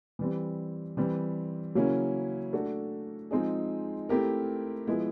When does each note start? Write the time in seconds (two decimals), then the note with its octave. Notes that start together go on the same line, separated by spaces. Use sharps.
0.19 E3 G3 C4
0.97 E3 G3 C4
1.75 C#3 F#3 A#3 C#4 E4
2.53 A3 D4 F#4 A4
3.31 F3 G#3 C4 D#4 G#4
4.09 A3 C4 E4 G4 A#4
4.87 F3 G#3 B3 E4